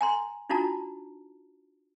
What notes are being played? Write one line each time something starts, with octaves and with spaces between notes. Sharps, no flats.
G#5 A#5 C6
D4 D#4 F4 F#4 A5 A#5